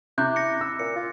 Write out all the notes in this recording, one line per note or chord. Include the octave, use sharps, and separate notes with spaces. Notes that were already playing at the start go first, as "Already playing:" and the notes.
C3 E4 D6 F#6 G6
A#6 C#7
E6
A#2 C#7
F4